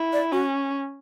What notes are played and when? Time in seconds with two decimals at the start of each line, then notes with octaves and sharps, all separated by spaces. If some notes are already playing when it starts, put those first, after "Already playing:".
Already playing: E4
0.13 D5
0.32 C#4 F#4